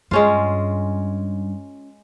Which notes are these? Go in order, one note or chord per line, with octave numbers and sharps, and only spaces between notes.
G2 G#3 C#4 F4